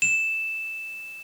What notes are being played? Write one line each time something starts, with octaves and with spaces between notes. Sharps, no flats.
E7